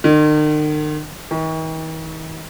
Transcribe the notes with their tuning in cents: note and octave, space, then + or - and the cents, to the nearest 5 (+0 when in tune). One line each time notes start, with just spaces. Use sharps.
D#3 -40
D#3 +45